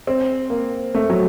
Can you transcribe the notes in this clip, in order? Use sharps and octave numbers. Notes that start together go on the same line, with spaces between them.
C4
A#3
A3
F#3